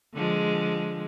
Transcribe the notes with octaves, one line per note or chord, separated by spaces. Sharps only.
D3 F3 G#3